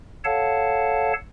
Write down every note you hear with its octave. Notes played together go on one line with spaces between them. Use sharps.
A4 C#5 F5 F#5 A5